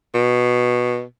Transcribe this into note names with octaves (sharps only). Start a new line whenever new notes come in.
B2